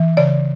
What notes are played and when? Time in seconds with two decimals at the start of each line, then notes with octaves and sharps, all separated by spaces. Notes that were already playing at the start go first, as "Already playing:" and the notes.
Already playing: E3
0.17 C#3 D5